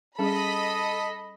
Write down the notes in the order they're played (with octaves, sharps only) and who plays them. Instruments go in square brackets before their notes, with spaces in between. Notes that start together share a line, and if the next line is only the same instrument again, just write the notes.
[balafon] G3 C#4 G#4 [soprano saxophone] A4 [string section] D#5 B5